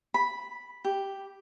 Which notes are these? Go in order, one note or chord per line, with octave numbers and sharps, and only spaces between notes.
B5
G4